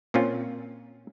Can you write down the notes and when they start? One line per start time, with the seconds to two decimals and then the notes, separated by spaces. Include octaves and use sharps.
0.14 A#2 C4 C#4 F4